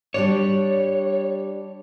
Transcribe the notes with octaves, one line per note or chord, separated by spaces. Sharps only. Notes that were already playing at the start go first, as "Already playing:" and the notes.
G3 D4 C#5 D5